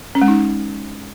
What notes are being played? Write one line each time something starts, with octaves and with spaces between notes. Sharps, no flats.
C#4
G#3
D#4